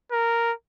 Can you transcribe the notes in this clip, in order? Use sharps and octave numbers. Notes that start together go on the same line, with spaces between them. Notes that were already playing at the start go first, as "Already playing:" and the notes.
A#4